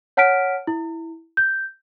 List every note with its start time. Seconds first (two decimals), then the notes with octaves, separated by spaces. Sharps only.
0.17 C#5 F#5 A5 F6 B6 D7
0.67 E4
1.37 G6